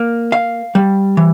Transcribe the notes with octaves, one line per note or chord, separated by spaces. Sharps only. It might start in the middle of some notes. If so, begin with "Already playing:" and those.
Already playing: A#3
F5
G3
E3